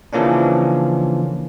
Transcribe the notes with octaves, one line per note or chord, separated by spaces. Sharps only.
C#3 E3 F3 A#3 C#4 D4